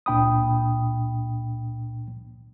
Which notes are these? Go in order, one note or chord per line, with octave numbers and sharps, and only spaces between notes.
C#2 A#2 D4 G5 B5 D#6